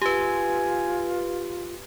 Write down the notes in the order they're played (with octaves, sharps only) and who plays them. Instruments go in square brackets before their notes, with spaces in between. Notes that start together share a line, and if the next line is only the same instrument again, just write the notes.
[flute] F4 [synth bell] G4 B4 [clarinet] G#5